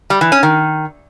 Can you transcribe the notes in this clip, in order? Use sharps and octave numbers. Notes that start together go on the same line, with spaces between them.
G3
E3
C#4
D#3